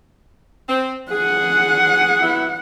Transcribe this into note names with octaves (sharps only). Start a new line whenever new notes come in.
C4
G#4 F#5
F#3 B3 E4